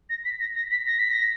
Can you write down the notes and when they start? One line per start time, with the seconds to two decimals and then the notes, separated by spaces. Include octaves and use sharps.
0.10 A#6
0.25 B6
0.40 A#6
0.55 A#6
0.71 B6
0.86 A#6
0.99 B6
1.12 A#6